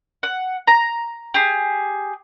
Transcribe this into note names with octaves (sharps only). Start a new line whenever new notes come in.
F#5
A#5
G4 G#4